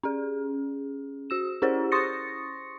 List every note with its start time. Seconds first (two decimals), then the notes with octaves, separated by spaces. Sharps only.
0.03 C#4 G#4
1.30 F#4 E6 E7
1.62 C#4 E4 G4 G#4 C5
1.92 C6 C#6 D#6 A6 A#6 C#7